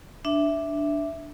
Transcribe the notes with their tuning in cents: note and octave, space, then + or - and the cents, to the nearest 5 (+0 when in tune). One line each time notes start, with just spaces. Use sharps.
D4 +0 E5 +0